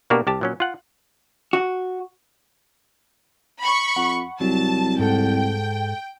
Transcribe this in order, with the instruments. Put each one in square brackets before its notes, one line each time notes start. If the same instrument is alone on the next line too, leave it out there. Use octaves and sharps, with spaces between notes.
[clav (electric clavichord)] B2 A#3 D4 F#4 G4 A#4
C2 G4 A5
A#2 F#3 C#4
F4 F#5
[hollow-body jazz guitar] F#4
[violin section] B5 C#6
[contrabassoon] F2 [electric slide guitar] F#5
[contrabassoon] C2 [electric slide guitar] F#3 [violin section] A5
[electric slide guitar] G#2 A4 F#5 [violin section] G5